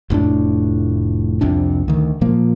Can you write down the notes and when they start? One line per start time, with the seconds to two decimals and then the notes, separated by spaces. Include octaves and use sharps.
0.10 F1 A2 C#4 D4
1.41 C2 F2 C3 D4
1.88 D2 D#3
2.21 A#2 F3 A#3